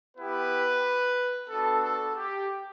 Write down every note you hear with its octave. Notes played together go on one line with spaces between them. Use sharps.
B3 E4 G4 B4
B3 D4 F#4 A4
A4
G4